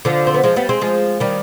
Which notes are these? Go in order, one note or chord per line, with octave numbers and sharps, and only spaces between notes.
D3 F3
C4
B3
F3 G#3
G3 B3
G#3 C4
F3 G#3
D#3 G3